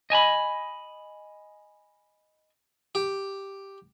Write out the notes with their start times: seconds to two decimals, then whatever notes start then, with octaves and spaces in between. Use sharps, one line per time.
0.10 D#5 G#5 A#5 B5
2.95 G4